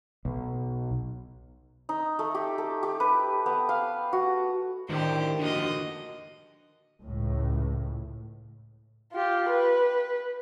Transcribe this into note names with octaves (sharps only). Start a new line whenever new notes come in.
B1
D#4
A3
G4
A4
G4
B4
B3
F5
F#4
A2 D3 D#3 G4 C5
D3 F3 A#3 F#4 D#5
C#2 A2
F4 G4
B4